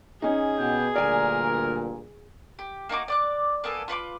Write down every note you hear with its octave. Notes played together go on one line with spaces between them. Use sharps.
C#4 D#4 G#4
B2 G4
D2 G2 A#2 A#4 D5 G#5
G4
A#3 D#4 F#4 D6
D5 D6 F#6
A#3 B3 A4 G#5
F4 B4 C#6 D6